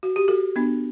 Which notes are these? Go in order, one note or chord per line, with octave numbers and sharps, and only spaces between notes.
F#4
G4
F#4 A4
B3 D4